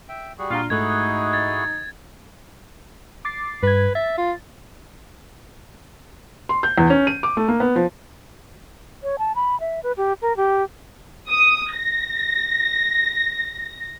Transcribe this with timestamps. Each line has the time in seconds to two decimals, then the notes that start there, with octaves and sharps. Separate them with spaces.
0.09 E5 G5
0.39 G3 F#4 G#4
0.50 A#2 D4 F4 A#5
0.70 G#2 A3 D#4 E4 F#4 G#4 F#6 G#6
1.33 G#6 A6
3.25 D6 A6 C7
3.63 G2 B4 G#6
3.95 E5 A6
4.18 F4
6.49 C6
6.63 G6
6.78 E2
6.90 C#4
7.07 D#7
7.23 D6
7.37 A3
7.48 A#3
7.60 B3
7.76 F3
9.03 C#5
9.19 A5
9.35 B5
9.60 E5
9.83 B4
9.97 G4
10.22 A#4
10.37 G4
11.29 D#6
11.73 A#6